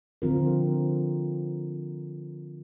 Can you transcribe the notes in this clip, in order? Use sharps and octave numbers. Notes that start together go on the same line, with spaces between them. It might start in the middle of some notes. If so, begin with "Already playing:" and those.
D3 F3 C4 F4 A#4